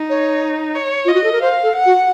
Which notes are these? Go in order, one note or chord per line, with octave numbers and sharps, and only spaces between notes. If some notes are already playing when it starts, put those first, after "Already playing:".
Already playing: D#4
C#5
C#5
F4 D#5
F#4
A4
A#4
C5 F5
A4
F#5
F#4